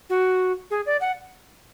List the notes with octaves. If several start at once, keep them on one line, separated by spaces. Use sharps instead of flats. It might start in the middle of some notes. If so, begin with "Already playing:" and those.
F#4
G#4
D5
F#5